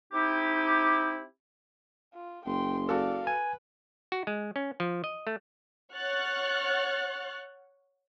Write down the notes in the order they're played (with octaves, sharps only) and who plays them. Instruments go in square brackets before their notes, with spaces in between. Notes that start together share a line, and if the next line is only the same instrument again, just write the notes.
[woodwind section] C4 D#4 E4 G4
[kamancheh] F4
[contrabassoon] F#1 [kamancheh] G5 C6
[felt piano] F#4 A4 [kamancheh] D5 F5
[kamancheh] B4 [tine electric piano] G#5
[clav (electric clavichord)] F#4
G#3
C#4
F3
D#5
A3
[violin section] C#5 F#5 C#6 F6 F#6 A6